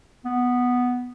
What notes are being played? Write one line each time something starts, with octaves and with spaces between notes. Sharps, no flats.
B3